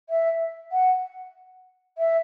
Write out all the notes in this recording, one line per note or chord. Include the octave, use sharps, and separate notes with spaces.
E5
F#5
E5